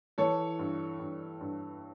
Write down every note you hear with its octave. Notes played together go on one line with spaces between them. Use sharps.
E3 A4 C#5
G2
G2
G2